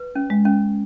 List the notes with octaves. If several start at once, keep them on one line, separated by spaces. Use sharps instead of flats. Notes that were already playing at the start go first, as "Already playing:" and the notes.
Already playing: B4
C#4
G#3
C#4